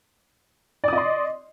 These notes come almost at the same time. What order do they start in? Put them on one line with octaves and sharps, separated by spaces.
D5 D#6 D#5 C6